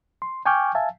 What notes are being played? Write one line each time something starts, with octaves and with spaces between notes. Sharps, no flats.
C6
G5 G#5 C#6 D6 F6 G6
E5 F5 G#5 A5